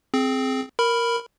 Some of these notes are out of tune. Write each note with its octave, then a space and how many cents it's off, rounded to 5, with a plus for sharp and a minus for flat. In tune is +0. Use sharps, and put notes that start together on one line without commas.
C4 +0 G#4 +25
A#4 +0 B5 +0